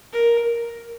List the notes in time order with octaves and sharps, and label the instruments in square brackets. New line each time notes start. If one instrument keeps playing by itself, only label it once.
[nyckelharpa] A#4